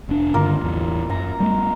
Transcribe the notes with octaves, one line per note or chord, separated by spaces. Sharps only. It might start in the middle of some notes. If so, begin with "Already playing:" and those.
F1 D4
G2 D3 D#3 A#3 F4 A#4
A1 E2
F#2 A#5
G3 A3